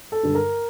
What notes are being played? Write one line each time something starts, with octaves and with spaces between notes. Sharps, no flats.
A4
G2 D3 G3
A#4